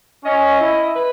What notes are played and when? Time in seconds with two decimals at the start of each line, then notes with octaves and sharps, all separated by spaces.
0.25 C#4 D#5
0.60 E4
0.95 B4